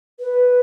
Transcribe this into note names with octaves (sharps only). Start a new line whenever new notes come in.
B4